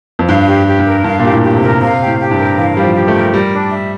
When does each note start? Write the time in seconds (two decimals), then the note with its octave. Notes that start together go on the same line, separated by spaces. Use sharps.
0.19 F2
0.29 G2 F5
0.47 G4
0.66 G4
0.79 G2
0.86 A#4
1.04 G2 F5
1.19 A#2 G4
1.30 A2
1.43 G4
1.56 C3
1.62 A#4
1.80 C3 F5
2.00 G4
2.06 A2
2.19 G4
2.31 G2
2.38 A#4
2.57 E3 F5
2.76 G3 G4
2.83 F3
2.95 G4
3.08 A3
3.14 A#4
3.33 G3 A#4
3.53 D4
3.72 E5